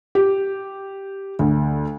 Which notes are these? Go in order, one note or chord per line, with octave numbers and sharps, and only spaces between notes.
G4
D2